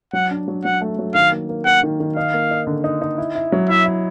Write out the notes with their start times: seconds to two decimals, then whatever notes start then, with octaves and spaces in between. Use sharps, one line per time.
0.13 F#3 F#5
0.31 D4
0.48 F#3
0.65 F#3 F#5
0.81 A3
0.99 F#3
1.14 D#3 F5
1.32 A#3
1.49 A#3
1.65 A#3 F#5
1.83 D#3
2.00 D#3
2.16 D#4 F5
2.34 A#3
2.51 D#4
2.67 D3
2.84 D#4
3.01 D#4
3.18 E4
3.35 E4
3.52 F#3
3.69 E4 E5
3.86 E4